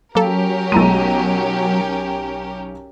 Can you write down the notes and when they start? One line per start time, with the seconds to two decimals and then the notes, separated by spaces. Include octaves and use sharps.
0.15 F#3 A#3 C#4 G4 A4 A#4
0.72 B1 G#3 A3 A#5 D#7